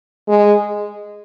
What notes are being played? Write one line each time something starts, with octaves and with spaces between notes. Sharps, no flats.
G#3